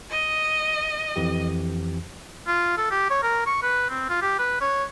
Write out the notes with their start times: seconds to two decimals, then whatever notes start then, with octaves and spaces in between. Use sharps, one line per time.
0.10 D#5
1.16 F2 E3 G4
2.47 F4
2.77 A4
2.91 G4
3.10 C#5
3.23 A#4
3.47 C#6
3.63 B4
3.90 C4
4.09 F4
4.22 G4
4.39 B4
4.61 C#5